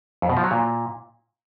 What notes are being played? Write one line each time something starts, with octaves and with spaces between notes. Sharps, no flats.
F2
B2
F3
F#3
A#2